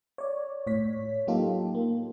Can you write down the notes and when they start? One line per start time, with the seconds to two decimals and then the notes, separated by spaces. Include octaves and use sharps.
0.18 C#5 D5
0.67 A2 C#5 B6
1.27 F#3 A#3 D#4 F4 G4 A4
1.75 A#3